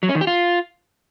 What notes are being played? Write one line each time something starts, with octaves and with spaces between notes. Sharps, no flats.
F#3
C#4
D#3
G4
F4